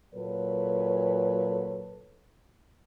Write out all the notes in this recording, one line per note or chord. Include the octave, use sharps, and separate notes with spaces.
A#2 F#3 A4 B4 C#5